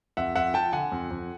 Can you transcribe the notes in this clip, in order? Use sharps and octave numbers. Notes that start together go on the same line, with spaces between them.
F2 E5 F#5
F2 E5 F#5
F3 G5 A5
D3 F#5 G#5
F2
F2